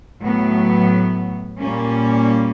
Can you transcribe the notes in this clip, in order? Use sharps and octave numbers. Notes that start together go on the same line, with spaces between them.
A2 F#3 B3
A#2 G3 A#3 C#4